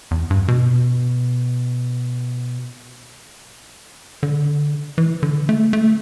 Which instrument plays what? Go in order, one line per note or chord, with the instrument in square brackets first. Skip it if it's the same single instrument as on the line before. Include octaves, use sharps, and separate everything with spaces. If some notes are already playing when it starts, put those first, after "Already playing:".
[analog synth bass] E2
G2
B2
D3
E3
D3
A3
A3